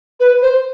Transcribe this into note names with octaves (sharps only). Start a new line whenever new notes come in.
B4
C5